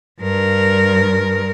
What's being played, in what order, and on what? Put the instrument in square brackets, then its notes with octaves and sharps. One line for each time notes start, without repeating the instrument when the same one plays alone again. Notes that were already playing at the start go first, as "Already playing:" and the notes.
[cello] G2 A#4